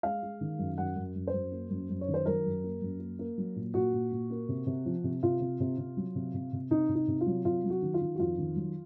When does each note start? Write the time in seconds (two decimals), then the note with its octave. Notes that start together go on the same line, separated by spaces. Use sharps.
0.03 G#3 F5
0.23 G#3
0.41 D#3
0.59 F#2
0.78 F#2 F#5
0.96 F#2
1.15 F#2
1.27 C5
1.34 F#2
1.52 A#3
1.70 F#2
1.90 F#2
2.01 C#5
2.08 D#3
2.14 C5
2.26 F#3 A#4
2.45 F#2
2.64 A#3
2.82 F#2
3.00 A#3
3.19 A#3
3.38 F#3
3.56 A#2
3.74 A#2 F#4
3.93 A#2
4.12 A#2
4.30 A#3
4.49 C3
4.67 C3
4.86 F3
5.04 C3
5.23 C3 F4
5.41 C3
5.60 C3
5.78 C3
5.97 F#3
6.15 C3
6.34 C3
6.53 C3
6.71 C3 D#4
6.89 C3
6.95 D#4
7.08 C3
7.21 F4
7.26 F#3
7.45 C3 F4
7.64 F#3
7.70 F#4
7.82 D#3
7.94 F4
8.01 D#3
8.15 F#4
8.19 F2 F4
8.38 D#3
8.56 F#3